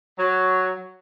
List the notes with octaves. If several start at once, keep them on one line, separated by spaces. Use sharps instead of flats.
F#3